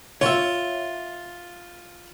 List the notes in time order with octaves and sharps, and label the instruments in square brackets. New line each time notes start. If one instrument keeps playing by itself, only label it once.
[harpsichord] F4 [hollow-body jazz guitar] C#5 E5